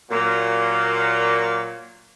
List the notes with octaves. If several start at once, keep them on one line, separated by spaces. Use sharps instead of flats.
A#2 F#3 A#3